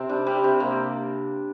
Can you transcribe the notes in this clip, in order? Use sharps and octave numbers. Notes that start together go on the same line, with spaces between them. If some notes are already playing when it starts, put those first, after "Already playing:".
Already playing: C3 C4
G3 D4
G3 D4
C3
C3 A#3